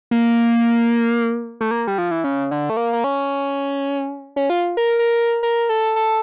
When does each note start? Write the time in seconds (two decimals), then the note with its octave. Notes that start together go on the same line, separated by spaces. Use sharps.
0.11 A#3
1.61 A3
1.71 A#3
1.87 G3
1.98 F3
2.11 E3
2.24 C#3
2.51 D3
2.70 A3
2.77 A#3
2.93 A#3
3.04 C#4
4.36 C#4
4.50 F4
4.77 A#4
4.99 A#4
5.43 A#4
5.69 A4
5.96 A4